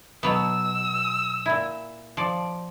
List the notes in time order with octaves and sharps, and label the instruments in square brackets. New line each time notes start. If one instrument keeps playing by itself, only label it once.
[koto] B2 F#3 B3 [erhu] E6
[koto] A#2 E4
F3 D5